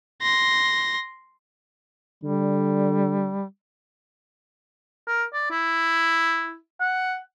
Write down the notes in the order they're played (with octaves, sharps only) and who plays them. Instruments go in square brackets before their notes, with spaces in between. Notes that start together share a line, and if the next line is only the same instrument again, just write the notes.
[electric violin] C6 A#6
[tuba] D3 [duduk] G3
[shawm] A#4
D5
E4
F#5